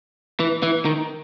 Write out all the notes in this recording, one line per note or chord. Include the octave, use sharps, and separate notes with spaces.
E3
E3
D#3